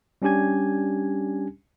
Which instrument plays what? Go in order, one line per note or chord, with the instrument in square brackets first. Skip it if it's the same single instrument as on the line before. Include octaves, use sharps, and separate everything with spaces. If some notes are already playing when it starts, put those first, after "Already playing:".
[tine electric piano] G3 C#4 D4 G4 G#5 G#6